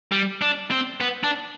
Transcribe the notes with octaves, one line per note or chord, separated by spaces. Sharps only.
G3
D4
C4
B3
D4